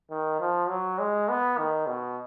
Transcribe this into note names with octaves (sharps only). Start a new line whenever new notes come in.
D#3
F3
F#3
G#3
B3
D#3
B2